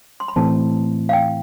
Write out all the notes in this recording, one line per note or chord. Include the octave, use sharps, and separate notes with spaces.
C6
B5
A2 E3 A3 C4 A5
F5
G5